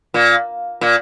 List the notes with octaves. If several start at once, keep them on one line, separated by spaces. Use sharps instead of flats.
A#2
A#2